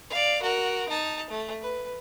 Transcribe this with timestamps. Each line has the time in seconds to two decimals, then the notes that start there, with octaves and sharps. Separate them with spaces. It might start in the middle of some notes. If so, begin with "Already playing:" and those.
0.10 D5 F5
0.42 F#4 A#4
0.89 D#4 A5
1.30 A3
1.61 B4